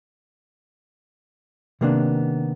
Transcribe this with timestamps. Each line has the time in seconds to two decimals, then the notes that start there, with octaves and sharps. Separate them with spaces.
1.81 C3 D#3 A#3 B3 C#4 D4